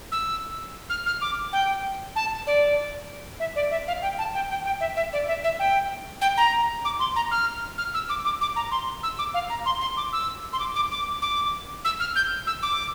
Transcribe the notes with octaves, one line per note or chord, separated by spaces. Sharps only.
E6
F6
F6
D6
G5
A5
D5
E5
D5
E5
F5
G5
A5
G5
G5
G5
E5
E5
D5
E5
E5
G5
G5
A#5
D6
C6
A#5
F6
F6
E6
D6
D6
D6
A#5
C6
E6
D6
F5
A#5
C6
C6
D6
E6
C6
D6
D6
D6
D6
E6
F6
G6
E6
D6